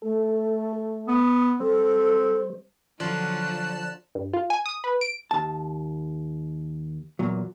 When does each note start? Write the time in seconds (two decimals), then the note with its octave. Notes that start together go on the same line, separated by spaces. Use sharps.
0.02 A3 A4
1.08 B3 D#6
1.60 G3 C4 A4 C5
3.00 D3 F3 F#3 F4 D5 A5 F#6
4.15 G2
4.33 F4
4.50 G#5
4.66 D#6
4.84 B4
5.01 D7
5.31 D#2 A5
7.19 E2 A#2 F#3